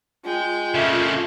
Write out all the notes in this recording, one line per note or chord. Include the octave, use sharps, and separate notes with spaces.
G#3 F4 G5
C#3 A3 A#3